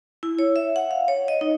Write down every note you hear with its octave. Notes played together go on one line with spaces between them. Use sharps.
E4
C#5
E5
F#5
F5
C#5
D#5
D#4